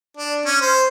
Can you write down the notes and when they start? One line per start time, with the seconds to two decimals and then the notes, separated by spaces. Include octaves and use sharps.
0.17 D4
0.46 C#4
0.61 C5